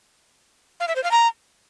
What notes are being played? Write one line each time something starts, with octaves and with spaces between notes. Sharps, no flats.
F5
E5
C5
F5
A#5